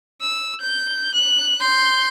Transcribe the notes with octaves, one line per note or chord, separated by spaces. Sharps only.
E6
G6
F#6
C6 G6